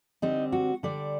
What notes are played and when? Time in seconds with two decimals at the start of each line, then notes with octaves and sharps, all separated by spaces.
0.22 D3 G3 C4 D#4
0.52 F#4
0.83 D3 G3 D4 D5